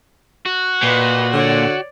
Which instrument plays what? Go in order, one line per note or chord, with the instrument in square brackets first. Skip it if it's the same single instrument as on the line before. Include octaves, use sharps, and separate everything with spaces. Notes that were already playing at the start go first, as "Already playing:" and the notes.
[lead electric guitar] F#4
[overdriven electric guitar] A#2 [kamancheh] B4 D#5
[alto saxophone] D3 [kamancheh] C#5 D5